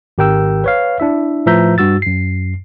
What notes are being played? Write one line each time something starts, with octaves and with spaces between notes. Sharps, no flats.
G#1 G4 A#4 G5 E6
B4 C#5 F5
D4 E4 E5
A2 F3 B4 E5 A#5 G6
G2 F#4 E6 A6
F#2 C7